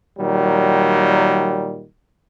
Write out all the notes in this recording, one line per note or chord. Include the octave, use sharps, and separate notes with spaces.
A#2 D#3 F#3 G3